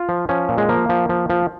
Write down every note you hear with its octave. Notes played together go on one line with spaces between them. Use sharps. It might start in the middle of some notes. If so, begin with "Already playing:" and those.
Already playing: F4
F3
F3 C#4
A#2
G#3
F3 A#3
F3
F3
F3